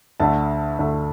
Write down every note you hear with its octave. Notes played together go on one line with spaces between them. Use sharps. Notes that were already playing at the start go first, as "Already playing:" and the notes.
D2 D3 A3 A5
D2 D3 A3